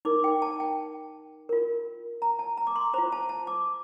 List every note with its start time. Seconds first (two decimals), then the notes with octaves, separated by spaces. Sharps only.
0.05 D#4 A#4 D6
0.24 G5
0.42 A5
0.60 G5
1.49 F4 A#4
2.22 A#5
2.39 A5
2.57 A#5
2.67 D6
2.76 C6
2.94 F4 C5 A#5
3.12 A5
3.29 A5
3.47 D6